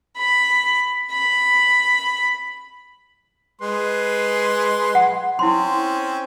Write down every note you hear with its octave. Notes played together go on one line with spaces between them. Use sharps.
B5
B5
G#3 B4 C6
F#5
C4 C#4 E4 C6